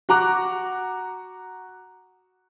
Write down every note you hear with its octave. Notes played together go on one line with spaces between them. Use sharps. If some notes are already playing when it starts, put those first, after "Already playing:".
F#4 F#5 A#5 D6 F#6